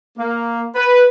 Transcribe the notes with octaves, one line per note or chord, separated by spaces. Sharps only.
A#3
B4